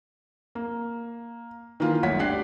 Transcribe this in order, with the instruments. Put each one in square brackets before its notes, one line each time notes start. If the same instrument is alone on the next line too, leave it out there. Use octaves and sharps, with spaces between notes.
[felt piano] A#3
D#3 E3 A#3 F4
G1 D2 C#5 F#5 B6
D4 G4 D5 F#6 C7